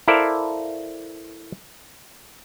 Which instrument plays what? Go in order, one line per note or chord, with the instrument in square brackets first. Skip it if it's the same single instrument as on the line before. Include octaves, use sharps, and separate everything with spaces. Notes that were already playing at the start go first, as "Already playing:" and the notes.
[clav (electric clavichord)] E4 A4 A#4 C5 D5 F5